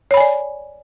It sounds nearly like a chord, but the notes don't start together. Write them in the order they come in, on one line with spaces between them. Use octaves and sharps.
C#5 B5 G#5 D5